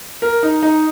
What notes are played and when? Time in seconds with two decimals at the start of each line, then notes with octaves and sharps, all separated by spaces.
0.22 A#4
0.43 D#4
0.62 D#4